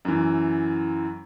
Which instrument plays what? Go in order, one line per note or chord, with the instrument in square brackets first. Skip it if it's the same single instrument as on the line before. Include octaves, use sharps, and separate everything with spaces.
[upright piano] F#2 E3